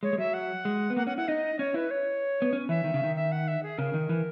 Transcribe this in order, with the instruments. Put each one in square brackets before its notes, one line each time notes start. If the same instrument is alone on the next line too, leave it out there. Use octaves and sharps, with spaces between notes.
[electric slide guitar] G#3 [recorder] C#5
[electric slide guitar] G#3
[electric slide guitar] F#3 [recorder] E5
[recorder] F#5
[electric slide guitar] G#3
B3
[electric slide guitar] A#3 [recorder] F#5
[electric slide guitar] C#4 [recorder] F#5
[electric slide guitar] E4 [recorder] F#5
[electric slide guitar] D#4 [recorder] D#5
[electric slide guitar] C#4 [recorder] C#5
[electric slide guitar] E4 [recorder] B4
[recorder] C#5
[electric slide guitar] B3
C#4
[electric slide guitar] E3 [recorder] E5
[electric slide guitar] D#3
C#3
D#3
[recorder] E5
F#5
E5
G#4
[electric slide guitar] C#3 [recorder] A#4
[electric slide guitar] D#3
E3